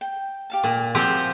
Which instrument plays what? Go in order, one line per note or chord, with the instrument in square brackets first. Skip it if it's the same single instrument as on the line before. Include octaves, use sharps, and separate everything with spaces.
[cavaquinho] G5
G4 F5 A5
[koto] A#2
[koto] F3 C4 G4 [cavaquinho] G#4 F#5